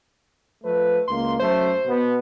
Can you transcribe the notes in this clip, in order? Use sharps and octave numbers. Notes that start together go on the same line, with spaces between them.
F3 A3 B4
C#2 A#3 C6
F#2 A3 C5
B2 B3